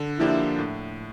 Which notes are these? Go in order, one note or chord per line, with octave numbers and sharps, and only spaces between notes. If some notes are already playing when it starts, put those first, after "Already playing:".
Already playing: D3
F3 A#3 D4 E4 G4
A2